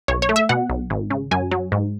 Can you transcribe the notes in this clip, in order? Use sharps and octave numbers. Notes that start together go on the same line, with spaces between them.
B1 C#5
C#5
A3
E5
B2 F#5
B1
G#1
C#3
F#2 G#5
F#3
G#2